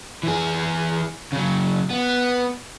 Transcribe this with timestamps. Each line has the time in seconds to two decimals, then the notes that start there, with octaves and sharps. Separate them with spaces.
0.23 E3 G#4
1.32 C#3 F#3
1.90 B3